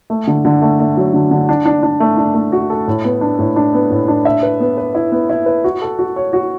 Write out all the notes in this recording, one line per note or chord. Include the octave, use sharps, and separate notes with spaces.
A3
D3
D3
A3
A3
F#3
D3
D3
D4
D4
D4
A3
D4
A3
F#4
A4
A2
B3
D4
A2
D4
B3
A2
D4
E5
B4
B3
B4
E4
B3
E4
B4
F#4
A4
F#4
C#5
F#4